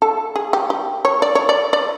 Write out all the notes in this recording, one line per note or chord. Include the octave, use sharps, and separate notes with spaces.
A4
G#4
G4
G4
C#5
D5
C#5
D5
D5